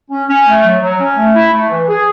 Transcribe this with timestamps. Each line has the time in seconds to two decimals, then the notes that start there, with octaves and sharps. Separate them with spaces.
0.11 C#4
0.28 C#4
0.46 A3
0.64 F#3
0.81 F#3
1.00 C#4
1.17 A3
1.34 E4
1.53 A3
1.70 E3
1.88 G#4